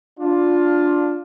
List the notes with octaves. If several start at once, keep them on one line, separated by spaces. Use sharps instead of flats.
D4 F4